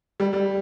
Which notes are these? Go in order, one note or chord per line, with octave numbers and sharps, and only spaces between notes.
G3
G3